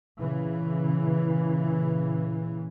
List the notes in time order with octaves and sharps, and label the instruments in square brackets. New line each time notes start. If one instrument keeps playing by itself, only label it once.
[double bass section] A#2 C#3 E3